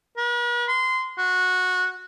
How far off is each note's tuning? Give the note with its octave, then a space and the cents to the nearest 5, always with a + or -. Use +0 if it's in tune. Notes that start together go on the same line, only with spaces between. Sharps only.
B4 -45
C6 -20
F#4 -15